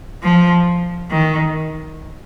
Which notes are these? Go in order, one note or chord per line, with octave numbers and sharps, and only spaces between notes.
F3
D#3